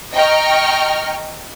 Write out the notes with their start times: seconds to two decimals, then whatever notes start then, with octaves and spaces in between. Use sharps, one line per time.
0.14 D#5 G5 A#5 C#6 F6